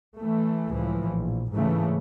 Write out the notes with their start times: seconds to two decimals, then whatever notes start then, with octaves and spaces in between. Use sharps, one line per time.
0.18 E3 A3
0.71 C#2 A2 E3 F3
1.09 A#1
1.54 G#2 C#3 E3 A3